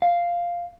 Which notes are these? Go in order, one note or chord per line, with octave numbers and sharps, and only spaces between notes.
F5